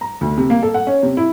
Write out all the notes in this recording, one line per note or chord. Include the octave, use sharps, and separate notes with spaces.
A#5
D2
C3
A#3
A4
F#5
C#4
C3
E4